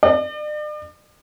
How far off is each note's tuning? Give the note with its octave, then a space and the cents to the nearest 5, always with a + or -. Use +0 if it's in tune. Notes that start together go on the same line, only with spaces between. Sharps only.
D5 +40